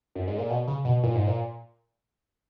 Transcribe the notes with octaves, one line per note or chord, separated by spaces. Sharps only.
F#2
G#2
A#2
B2
C#3
B2
A#2
G#2
A#2